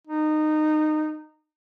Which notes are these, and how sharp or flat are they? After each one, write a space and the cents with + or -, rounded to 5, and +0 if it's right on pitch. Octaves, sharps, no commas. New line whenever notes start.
D#4 -20